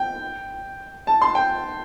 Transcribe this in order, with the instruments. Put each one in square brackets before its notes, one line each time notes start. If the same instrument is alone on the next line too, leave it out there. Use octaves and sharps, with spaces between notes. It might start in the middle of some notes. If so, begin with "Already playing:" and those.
Already playing: [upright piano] G5
A5
C6
G5